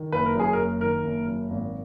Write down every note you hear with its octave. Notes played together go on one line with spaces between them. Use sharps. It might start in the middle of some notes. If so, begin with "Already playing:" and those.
Already playing: D#3
F#1 B4
A#4
F#2 G#4
A#4
F#1
D#3 A#4
F#1
F#2
G#1